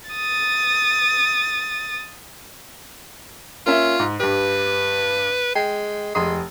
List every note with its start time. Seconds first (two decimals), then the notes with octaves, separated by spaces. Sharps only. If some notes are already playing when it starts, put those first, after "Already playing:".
0.10 D#6 A6
3.66 A#3 C#4 F4 E5
4.00 G#2
4.20 G2 G4 B4
5.55 G#3 G5
6.15 F1 G#3 C6 D#6